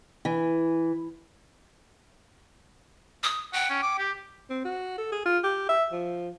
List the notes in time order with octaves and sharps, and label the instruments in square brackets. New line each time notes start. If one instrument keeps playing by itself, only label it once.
[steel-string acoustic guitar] E3
[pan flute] D#6
[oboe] F#5 [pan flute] G5
[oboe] C#4
D6
G4
[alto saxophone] C4
F#4
A4
G#4
F4
G4
E5
F3